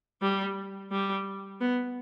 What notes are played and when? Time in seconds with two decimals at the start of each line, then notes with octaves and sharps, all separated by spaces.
0.21 G3
0.91 G3
1.61 B3